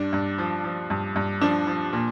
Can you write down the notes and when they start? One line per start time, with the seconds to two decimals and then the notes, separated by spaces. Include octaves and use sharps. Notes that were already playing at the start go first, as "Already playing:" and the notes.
Already playing: G2 D4
0.13 G2
0.38 F3
0.64 F3
0.90 G2
1.16 G2
1.41 F3 D4
1.67 F3
1.93 A#2